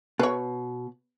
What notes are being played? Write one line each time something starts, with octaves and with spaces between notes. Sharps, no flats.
B2 B4 C#5